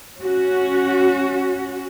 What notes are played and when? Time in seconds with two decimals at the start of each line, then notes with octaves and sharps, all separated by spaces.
0.19 C#4 F#4